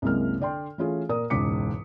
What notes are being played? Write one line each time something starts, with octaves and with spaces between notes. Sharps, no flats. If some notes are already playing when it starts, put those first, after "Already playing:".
C2 F#2 C3 G#3 A#3 F6
D3 D5 G5 C6
E3 A3 C#4 F4 G#4
A#2 A#4 D5 D#6
E1 C#2 G#2 D6 B6 C#7